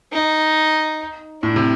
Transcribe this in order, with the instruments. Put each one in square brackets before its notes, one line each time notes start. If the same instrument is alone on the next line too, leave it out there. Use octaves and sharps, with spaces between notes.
[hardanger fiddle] D#4
[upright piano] A2 [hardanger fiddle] D4
[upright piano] C3